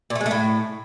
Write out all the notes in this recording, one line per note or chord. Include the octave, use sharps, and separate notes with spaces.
A#2
A3
G#3
A3
A2